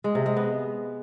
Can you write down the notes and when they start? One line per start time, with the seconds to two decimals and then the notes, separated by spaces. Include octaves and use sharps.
0.04 G#3
0.15 C3
0.26 G#3
0.37 B3